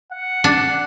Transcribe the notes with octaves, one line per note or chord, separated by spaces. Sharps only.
F#5
D4